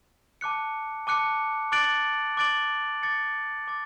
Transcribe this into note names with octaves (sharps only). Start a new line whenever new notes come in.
A5 D6 F#6 C#7
A5 D6 F#6 C#7
D6 F#6 A6 D7 F#7
D6 F#6 A6 D7 F#7
D6 A6 C#7
D6 A6